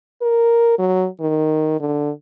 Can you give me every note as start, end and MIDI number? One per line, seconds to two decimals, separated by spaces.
0.22 0.75 70
0.79 1.07 54
1.21 1.77 51
1.80 2.11 50